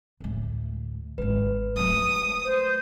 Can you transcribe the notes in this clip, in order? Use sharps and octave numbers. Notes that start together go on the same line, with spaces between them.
D2 A2
G#1 G#2 B4
F#3 A3 D#6
C5